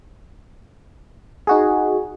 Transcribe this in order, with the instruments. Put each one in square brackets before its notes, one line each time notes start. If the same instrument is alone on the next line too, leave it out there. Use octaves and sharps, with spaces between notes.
[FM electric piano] D#4 F#4 G#4